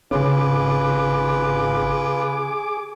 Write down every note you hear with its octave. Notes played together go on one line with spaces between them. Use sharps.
G#1 C#3 C#4 F4 G#4 B4 D6